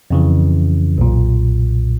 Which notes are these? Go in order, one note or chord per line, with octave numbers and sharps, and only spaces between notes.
F2 C#3 E3
B1 A#2